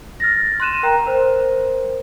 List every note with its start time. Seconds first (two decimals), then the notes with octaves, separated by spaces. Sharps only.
0.20 F6 A6 A#6
0.60 C6 F#6 D#7 E7
0.83 A#4 G5 A#5
1.06 A#4 C5